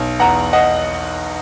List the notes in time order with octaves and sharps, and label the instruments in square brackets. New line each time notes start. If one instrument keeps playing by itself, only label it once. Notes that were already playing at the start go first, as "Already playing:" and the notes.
Already playing: [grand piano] B1
E2 F#5 A#5
D#5 F#5